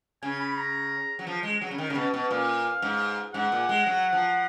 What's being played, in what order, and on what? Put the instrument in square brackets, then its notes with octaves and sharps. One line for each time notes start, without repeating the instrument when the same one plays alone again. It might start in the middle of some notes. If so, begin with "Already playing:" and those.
[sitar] C#3 [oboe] G#5
[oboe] B5
B5
A#5
[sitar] F#3
F3
G#3
F#3
C#3
D#3
C#3
B2
B2
[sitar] A#2 [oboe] F5
[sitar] G#2
[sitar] G#2 [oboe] F#5
[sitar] A#2
G#3
F#3
F3